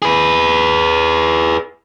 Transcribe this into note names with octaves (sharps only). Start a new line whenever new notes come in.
G#4 B4